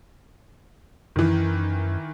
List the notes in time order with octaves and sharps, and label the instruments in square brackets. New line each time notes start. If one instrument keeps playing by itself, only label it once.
[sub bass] F#2 [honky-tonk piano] D#3 E3